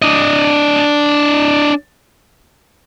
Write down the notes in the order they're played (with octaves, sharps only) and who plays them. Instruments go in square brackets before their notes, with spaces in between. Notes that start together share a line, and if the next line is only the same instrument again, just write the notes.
[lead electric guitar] D4 D#5